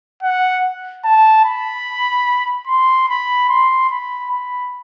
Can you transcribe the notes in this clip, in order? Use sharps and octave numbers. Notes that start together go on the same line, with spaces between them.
F#5
A5
B5
C6
B5
C6
B5
B5